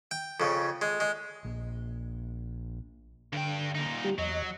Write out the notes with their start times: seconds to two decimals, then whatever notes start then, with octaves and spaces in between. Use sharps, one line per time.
0.11 G5
0.40 F2 C#3
0.81 G#3
1.00 G#3
1.45 A#1
3.33 G2 D3 G5
3.75 A#2 D#4
4.04 G3 G4
4.18 E2 F#3 D#5